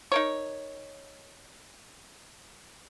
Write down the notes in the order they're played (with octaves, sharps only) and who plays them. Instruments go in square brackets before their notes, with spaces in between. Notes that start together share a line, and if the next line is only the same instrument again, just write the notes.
[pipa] D#4 A#4 C#5